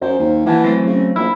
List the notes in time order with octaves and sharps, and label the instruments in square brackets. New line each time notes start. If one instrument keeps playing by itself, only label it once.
[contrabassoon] F#2 [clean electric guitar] C5
[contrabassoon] D#2
[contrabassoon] E3 [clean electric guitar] A#3 F#5 A5
[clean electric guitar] F#3 A3 C4
[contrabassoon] C#3
[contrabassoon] A#1 [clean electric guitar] E4